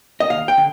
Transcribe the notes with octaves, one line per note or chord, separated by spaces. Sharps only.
D#5
D#2 F5
G5
D3